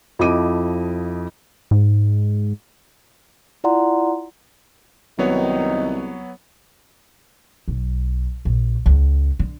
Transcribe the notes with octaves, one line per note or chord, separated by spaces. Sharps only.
F2 F3 E4 D#5 D6 D#7
G#2
E4 F4 D5 F#5 A#5 C6
C2 D#3 F#3 B3 D#4 C#5
B1
A#1
C#2
D3